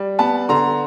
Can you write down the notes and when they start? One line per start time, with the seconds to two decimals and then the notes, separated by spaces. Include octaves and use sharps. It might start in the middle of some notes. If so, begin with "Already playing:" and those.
Already playing: G3
0.19 B3 A5 B5
0.49 D3 A#5 C6